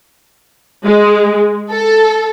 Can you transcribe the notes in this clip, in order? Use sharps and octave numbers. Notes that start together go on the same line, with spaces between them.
G#3
A4